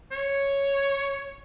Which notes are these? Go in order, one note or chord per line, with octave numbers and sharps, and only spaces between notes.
C#5